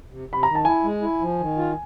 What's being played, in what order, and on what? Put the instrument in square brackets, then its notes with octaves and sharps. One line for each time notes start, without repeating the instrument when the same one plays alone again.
[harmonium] C3
[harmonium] C3 [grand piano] B5
[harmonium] D#3 [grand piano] A#5
[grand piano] A5
[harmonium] E4 [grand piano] G#5
[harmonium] G#3
E4
F3
D#3
F4